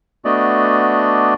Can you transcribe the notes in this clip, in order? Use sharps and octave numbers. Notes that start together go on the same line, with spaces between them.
A3 B3 D4 F#4 D5 D#5